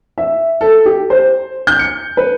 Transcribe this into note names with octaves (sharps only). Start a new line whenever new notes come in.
E5
A4
G4
C5
G6
C#7
B4